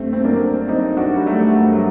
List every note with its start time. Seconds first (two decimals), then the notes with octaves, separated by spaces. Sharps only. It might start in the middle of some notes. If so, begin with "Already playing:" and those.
Already playing: G2 A3 C4
0.13 C4
0.24 F#3 A#3 D4
0.68 F#3 C4 D#4
0.97 D4 F#4
1.12 F#3 G3
1.26 F#3 A3
1.57 G2 A3
1.64 G3
1.72 F#3